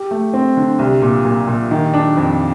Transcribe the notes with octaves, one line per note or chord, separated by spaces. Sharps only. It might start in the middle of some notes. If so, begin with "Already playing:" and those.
Already playing: G4
A3
C4
D3
C2
A#2
A#2
A#2
D#3
D4
F2